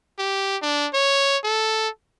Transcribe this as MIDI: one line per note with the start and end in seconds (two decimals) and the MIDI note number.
0.19 0.57 67
0.62 0.88 62
0.94 1.38 73
1.44 1.89 69